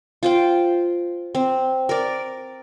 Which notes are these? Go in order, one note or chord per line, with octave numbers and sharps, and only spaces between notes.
F4 C5 G5
C4
A#4 D5